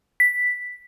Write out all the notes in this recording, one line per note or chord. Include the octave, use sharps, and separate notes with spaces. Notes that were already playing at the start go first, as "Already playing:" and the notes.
B6